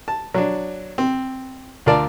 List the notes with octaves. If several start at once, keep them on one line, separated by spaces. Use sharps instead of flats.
A5
F#3 D4
C4
D2 F4 A#4 D5 A5